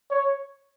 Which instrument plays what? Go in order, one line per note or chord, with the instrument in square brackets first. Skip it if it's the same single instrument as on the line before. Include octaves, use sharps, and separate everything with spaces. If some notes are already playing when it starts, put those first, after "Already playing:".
[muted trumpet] C#5